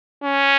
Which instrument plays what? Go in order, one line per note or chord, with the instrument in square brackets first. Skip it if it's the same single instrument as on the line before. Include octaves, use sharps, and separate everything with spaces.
[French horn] C#4